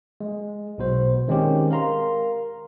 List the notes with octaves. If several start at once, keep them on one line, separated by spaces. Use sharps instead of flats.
G#3
B1 B2 C5
D#3 G#3 C4 C#4 G4
A#4 F5 A#5 C6